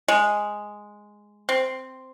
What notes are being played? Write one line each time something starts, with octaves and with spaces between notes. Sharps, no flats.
G#3
C4